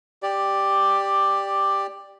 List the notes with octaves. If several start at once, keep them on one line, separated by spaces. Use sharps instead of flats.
G4 D5